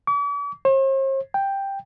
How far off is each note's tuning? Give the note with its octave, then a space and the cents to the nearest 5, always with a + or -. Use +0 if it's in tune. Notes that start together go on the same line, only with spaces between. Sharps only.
D6 -45
C5 +45
G5 +5